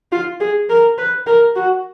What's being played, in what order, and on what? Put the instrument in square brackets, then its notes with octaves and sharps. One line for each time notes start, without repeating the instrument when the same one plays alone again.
[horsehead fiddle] F4
G#4
A#4
B4
A#4
F#4